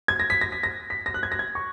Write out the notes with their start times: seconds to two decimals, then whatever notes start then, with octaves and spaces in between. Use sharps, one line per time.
0.08 G#6
0.20 A#6
0.30 B6
0.41 A#6
0.52 B6
0.63 A#6
0.90 B6
1.06 A#6
1.14 F#6
1.23 G#6
1.32 A#6
1.39 G#6
1.55 C#6